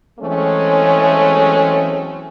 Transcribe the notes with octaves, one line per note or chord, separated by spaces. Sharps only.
E3 F#3 G#3 A3 C4 C#4